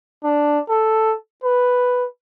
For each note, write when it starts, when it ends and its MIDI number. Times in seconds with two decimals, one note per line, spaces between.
0.24 0.59 62
0.69 1.15 69
1.44 2.06 71